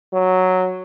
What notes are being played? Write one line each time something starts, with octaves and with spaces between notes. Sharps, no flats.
F#3